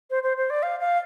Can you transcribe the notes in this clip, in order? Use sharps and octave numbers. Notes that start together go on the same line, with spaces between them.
C5
C5
C5
D5
F5
F5